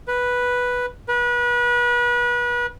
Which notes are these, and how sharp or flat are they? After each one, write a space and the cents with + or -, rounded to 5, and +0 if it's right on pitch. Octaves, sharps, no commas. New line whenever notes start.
B4 -5
B4 -30